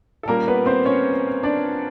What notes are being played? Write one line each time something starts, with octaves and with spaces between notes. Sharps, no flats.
A4
A#2 G3 A#3 C#4 A#4
B3 B4
C4 C5
C#4 C#5
D4 D5